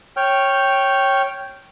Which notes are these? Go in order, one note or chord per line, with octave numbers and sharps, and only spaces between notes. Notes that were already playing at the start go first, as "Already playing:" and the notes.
C#5 G5 F6